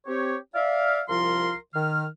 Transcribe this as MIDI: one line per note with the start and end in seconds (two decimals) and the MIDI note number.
0.06 0.36 60
0.06 0.36 67
0.06 0.36 73
0.55 1.01 74
0.55 1.01 76
0.55 1.01 77
1.09 1.54 36
1.09 1.54 53
1.09 1.54 65
1.09 1.54 70
1.09 1.54 77
1.09 1.54 84
1.74 2.05 51
1.74 2.05 89